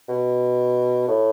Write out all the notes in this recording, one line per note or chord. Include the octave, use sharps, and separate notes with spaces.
B2
A2